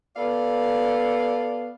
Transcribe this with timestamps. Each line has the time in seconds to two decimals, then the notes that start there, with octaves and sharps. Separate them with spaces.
0.16 B3 A4 D5 F5